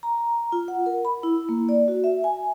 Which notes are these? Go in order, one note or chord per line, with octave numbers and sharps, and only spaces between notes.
A#5
F4
F#5
A#4
B5
E4
A#3
D5
F#4
E5
G#5